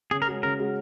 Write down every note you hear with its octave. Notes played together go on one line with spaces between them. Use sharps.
C#3 G#4
A#4
G#3 C#4 F#4
C#3 A#4
G#3 C#4 F#4